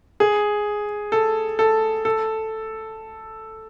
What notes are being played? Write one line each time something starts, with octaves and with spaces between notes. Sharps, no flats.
G#4
A4
A4
A4